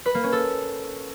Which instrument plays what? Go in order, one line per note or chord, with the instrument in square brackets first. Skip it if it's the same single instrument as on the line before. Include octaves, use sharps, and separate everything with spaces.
[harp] B4
A#3
C#4
A4